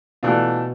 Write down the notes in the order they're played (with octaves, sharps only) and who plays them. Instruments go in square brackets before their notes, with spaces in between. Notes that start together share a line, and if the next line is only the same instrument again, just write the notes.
[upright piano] B2 [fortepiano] E3 A3 D4 F4